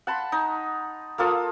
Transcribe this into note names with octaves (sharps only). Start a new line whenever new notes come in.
F#5 A5 B5 C6
D#4
A#3 F4 A4 D#6